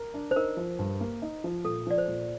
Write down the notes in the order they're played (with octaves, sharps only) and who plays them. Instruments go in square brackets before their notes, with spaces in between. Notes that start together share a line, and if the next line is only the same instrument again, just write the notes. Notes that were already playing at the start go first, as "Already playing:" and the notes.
Already playing: [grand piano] A#4
D4
[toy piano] C5
[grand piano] D#4 [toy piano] A#4
[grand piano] F3
G2
A#3
D#4
F3
[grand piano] A#2 [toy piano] A4
[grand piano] F3 [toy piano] D5
[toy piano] C5
[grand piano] A#2